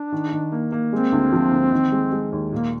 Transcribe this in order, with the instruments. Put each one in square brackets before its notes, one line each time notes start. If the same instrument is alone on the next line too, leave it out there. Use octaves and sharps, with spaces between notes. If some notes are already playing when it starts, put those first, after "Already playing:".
Already playing: [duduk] D4
[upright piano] D#3
D#3
A#3
A#3
[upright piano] G#3 [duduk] C4
[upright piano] D2
F3
D2
D#3
G#3
G#3
D#2
[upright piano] A#2 [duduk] A#3